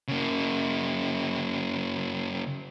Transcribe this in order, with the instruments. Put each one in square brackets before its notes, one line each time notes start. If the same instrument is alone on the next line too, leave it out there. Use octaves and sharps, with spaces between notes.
[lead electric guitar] C#3 A#3